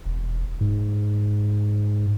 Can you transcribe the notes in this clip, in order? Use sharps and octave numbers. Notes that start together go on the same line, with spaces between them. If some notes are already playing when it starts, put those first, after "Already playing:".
E1
G#2